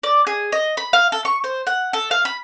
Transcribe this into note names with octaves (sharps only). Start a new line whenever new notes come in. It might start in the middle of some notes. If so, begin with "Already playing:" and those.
D5
G#4
D#5
B5
F5
A4
C#6
C5
F#5
A4
F5
B5